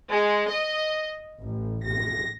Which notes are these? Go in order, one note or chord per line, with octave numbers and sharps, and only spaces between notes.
G#3
D#5
A1
A#6